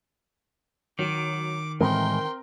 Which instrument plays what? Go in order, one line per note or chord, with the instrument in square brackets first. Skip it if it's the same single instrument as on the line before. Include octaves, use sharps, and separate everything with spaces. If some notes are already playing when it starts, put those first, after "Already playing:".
[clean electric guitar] D#3 [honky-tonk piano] F#3 [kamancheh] D6
[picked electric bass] A2 E3 G#3 [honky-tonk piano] C4 A#4 [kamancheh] G5 C6